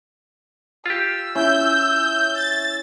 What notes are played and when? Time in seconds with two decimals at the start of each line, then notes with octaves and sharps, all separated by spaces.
0.86 F4 G4 E6
1.35 C#4 E4 G6
2.35 A6